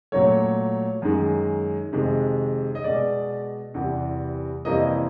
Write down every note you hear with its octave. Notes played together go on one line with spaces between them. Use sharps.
A#2 F#3 A3 C#5
F#2 D#3 G#3
F2 C3 D#3 G#3
D#5
B2 G#3 D5
E2 C3 E3 G3
F2 C3 E3 G3 A#3 D#5